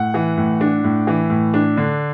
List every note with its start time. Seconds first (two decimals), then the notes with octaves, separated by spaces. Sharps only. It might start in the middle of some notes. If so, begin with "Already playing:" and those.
Already playing: A2 F#5
0.14 E3
0.37 A2
0.61 D4
0.84 A2
1.07 E3
1.30 A2
1.54 D4
1.77 D3